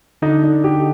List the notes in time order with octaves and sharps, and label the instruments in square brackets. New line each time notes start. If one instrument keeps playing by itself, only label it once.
[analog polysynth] D3 [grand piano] D#4
[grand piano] D#4
G4